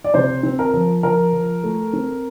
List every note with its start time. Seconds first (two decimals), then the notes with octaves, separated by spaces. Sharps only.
0.04 D5
0.14 C3 C5
0.43 C4
0.59 A#4
0.74 F3
1.03 F3 A#4
1.33 F3
1.64 A3
1.93 C4